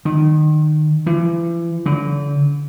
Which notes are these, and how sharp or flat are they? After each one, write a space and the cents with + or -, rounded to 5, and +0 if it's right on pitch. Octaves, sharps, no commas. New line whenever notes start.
D#3 -25
E3 +40
D3 -40